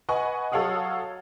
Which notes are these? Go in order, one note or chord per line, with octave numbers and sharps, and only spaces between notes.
B4 D#5 F#5 G#5 C#6
F#3 A4 C#5 F5 F#5 D#6